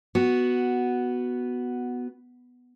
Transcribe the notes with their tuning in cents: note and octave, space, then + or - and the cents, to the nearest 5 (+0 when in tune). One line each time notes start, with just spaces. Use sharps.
B3 +0 F#4 +0